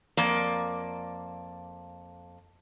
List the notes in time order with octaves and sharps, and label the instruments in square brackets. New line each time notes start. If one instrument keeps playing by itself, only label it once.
[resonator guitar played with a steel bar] F2 A#3 D5